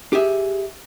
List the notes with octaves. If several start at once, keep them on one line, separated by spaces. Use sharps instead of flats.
G4 G#4 E5